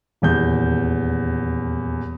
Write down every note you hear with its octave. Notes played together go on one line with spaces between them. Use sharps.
D#1 E2 G6